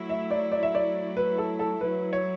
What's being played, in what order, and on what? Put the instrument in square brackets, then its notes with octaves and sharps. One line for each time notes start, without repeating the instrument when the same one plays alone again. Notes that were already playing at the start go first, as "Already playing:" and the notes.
Already playing: [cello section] F#3 A3 E4
[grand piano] E5
D5
D5
E5
D5
B4
A4
A4
[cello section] F#3 A3 E4 [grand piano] B4
[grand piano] C#5